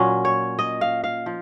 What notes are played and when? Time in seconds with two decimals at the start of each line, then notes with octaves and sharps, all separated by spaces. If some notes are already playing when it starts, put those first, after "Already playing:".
Already playing: A#2 F#3 C#4
0.25 C#5
0.59 D#5
0.81 F5
1.04 F5
1.26 F3